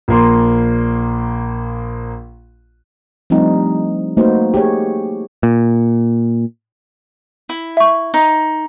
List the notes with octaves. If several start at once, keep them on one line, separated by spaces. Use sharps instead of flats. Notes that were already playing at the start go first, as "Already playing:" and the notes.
A#1 A#3 C6
F3 G3 A3 C4 D4 D#4
A3 A#3 D#4 F#4 B4 C5
G4 G#4 C#5
A#2
E4
E5 C#6
D#4